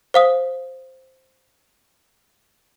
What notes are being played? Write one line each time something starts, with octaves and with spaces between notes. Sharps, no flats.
C5 F5 D#6